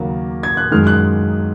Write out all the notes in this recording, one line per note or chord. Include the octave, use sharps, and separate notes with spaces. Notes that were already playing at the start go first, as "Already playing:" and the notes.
Already playing: D#2 C#3 F#3 A#3
G#6
F#6
F#2 D#3 G#3 F6
F#6